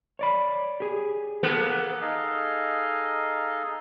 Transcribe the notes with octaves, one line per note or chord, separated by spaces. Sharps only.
C#5 D5 B5
G4 G#4
A#3 B3 A4
D#4 G#4 A4 D#5 F5 G#5